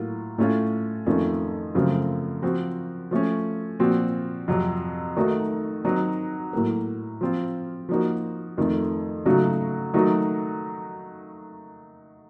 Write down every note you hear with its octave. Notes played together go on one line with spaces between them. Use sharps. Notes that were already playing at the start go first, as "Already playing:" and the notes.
Already playing: A2 F#3 A#3 F4
A2 A3 C#4 F4
F2 D#3 A3 C#4 F4
F#2 C#3 F3 A3 C4
F3 C4 F#4
F3 A3 C#4
A#2 F3 C4 F#4
F2 C3 F#3
D#3 A3 D#4 F#4
D#3 F#3 C4 D#4 F#4
A2 F#3 A#3
F3 C4 F4
F3 A#3 D#4 F#4
F2 D#3 A3
C#3 F#3 A3 D#4 F#4
D#3 F#3 A3 D#4 F#4